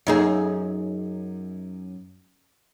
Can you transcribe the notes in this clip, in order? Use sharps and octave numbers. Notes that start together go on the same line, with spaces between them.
F#2 D#4 G#4